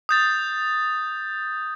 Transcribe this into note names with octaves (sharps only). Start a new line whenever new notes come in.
D#6 G6 A6